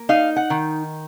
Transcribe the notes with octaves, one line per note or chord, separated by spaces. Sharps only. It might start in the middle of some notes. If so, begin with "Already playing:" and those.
Already playing: A#3
D#4 F5
F#5
D#3